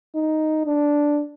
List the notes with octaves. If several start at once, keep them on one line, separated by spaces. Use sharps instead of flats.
D#4
D4